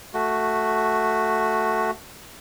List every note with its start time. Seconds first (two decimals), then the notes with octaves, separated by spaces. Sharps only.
0.14 A3 F#4